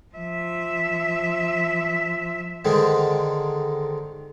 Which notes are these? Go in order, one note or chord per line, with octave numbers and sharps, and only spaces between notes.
F3 E5
D3 D#3 G#3 C4